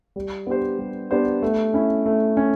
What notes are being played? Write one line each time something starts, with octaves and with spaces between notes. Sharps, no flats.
G3
B3 D4 G4 C5
G3
B3 D4 G4 C5
A3
C#4 E4
A3
C#4